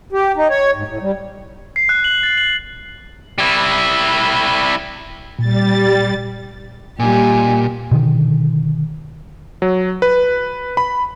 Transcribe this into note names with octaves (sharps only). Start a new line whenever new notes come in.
G4
D#4
C#5
G#2
A2
G3
C7
F#6
F#7
A6
F#7
G3 E4
A#2 G3 A6
A#2 G3 D#4 G4 G#5
B2 D3 D#3
F#3
B4
B5